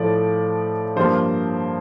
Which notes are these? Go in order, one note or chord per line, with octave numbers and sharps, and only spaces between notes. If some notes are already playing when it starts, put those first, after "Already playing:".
Already playing: A2 F3 A3 D5
G2 F3 A#3 C5